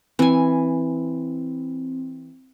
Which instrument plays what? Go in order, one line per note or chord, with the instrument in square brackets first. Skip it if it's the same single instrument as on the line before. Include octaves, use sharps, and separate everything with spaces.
[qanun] E3 G#5 [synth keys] C4